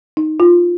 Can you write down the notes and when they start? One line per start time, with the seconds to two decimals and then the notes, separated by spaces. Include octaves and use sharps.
0.17 D#4
0.40 F4